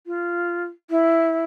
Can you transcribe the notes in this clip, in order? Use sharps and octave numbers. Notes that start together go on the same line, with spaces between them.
F4
E4